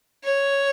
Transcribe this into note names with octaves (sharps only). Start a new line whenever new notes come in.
C#5